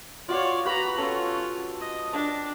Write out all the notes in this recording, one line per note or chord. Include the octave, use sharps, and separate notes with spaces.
F4 F#4 C#5 D5 F5
F#4 G4 B4 A#5 B5
C#4 F4 A4 C#5 E6
D#5
D4 D5 G5 A5